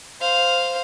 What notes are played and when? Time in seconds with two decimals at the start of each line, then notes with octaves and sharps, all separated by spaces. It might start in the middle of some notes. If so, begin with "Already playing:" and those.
0.20 C5 F5